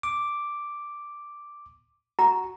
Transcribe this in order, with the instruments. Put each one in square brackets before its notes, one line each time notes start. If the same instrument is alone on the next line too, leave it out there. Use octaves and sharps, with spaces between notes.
[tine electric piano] D6
[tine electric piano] F#4 [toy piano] A#5